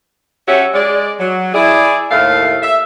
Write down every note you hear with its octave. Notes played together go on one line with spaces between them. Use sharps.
F#3 C#4 F#4 G4 C#5 E5
G#3 D5
F#3
E4 G#4 D5
D#2 A2 A3 F5
E5